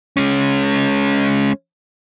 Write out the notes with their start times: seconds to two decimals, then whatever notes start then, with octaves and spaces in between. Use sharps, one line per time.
0.17 G#3 C#4